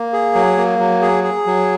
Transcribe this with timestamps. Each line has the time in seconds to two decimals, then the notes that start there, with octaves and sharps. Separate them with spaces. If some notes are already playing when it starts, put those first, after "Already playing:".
Already playing: A#3
0.13 G#4
0.35 F#3
0.57 A#3
0.79 F#3
1.02 G#4
1.24 G#4
1.46 F#3